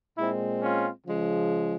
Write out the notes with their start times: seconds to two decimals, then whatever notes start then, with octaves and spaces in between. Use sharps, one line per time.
0.18 A#2 G#3 C4 E4
0.62 C#4 F4
1.06 C#3 F3 G#3